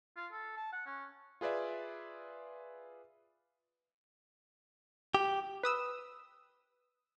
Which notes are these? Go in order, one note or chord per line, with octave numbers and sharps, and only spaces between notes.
F4
A4
A5
F#5
C#4
F4 G#4 B4 D5 E5
G4
B4 D#6 E6